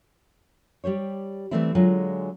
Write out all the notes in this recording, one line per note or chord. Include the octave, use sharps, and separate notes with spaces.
G3 G4 C5 C#5
E3 F3 G3 A3 C4 E4
D3 F#3 G#3 F4 G#4